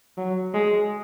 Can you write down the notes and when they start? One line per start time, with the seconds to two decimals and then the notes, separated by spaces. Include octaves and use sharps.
0.17 F#3
0.54 G#3